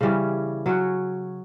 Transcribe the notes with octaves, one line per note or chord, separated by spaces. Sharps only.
C#3 E3 G3 C#4
F#3 C#4 F#4